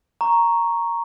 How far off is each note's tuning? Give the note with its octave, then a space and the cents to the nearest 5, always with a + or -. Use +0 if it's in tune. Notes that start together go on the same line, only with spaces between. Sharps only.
A#5 +0 C#6 +0